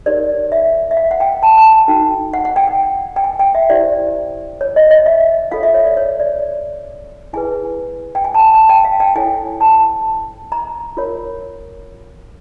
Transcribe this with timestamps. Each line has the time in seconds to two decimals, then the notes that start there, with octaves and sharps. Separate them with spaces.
0.06 D#4 G4 A#4 C#5 D5
0.52 E5
0.91 E5
0.97 F5
1.11 F#5
1.20 G5
1.43 A5
1.57 A5
1.73 G#5
1.88 D#4 F#4 A4 G5
2.34 F#5
2.45 F#5
2.56 G5
2.68 G5
3.16 G5
3.24 G#5
3.39 G5
3.55 E5
3.70 E4 G4 C5 D5
4.61 C#5
4.76 D#5
4.91 D#5
5.06 E5
5.51 F4 A4 C#5 F5
5.63 E5
5.74 C#5
5.85 D5
5.97 C#5
6.20 D5
7.33 E4 G#4 B4 G#5
8.15 G5
8.24 G#5
8.34 A5
8.39 G#5
8.54 A5
8.69 G5
8.85 F5
9.00 G5
9.15 E4 A4 C#5 G#5
9.60 A5
10.52 A#5
10.97 F4 A#4 C#5